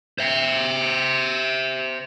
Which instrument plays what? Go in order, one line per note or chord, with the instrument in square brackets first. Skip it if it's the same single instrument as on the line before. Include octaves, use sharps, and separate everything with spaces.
[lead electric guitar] C5 E5